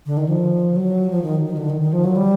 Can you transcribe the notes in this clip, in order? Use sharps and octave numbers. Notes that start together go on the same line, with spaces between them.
D3
D#3
F3
F#3
F3
D#3
D#3
D3
D#3
D#3
F3
F#3
G3